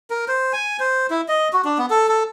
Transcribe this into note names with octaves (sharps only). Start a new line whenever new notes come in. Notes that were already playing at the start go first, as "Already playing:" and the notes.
A#4
C5
G#5
C5
E4
D#5
F#4
D4
B3
A4
A4